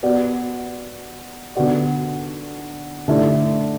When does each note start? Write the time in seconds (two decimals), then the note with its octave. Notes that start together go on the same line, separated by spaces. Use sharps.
0.03 B3 F#4 D5
1.55 D3 B3 F#4 D5
3.08 D3 A3 E4 D5